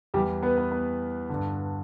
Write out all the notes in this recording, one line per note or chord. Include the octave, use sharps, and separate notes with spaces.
E2 E3 G3 G4
B3 B4
B3
B3
G2 D3